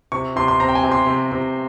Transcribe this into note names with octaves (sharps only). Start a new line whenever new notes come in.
C3 C#6
C3 C6
C6
C4 A#5
G5
G#5
C3
C6
C3
C3